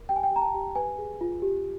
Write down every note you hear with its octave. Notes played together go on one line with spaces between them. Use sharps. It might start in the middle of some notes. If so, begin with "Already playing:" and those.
Already playing: A#4
G4 G5
G#5
G5
G4
A#5
A5
G4
B4 G#5
G#4
F4
G4